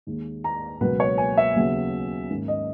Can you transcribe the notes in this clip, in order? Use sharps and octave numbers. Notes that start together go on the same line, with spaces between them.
D#2 D#3 G#3
A#5
C#2 B2 F#3 A#3 C#4 B4
C#5
G#5
E5
D#2 C#3 F#3 B3
G#2 D#3 A#3 C#4
D#5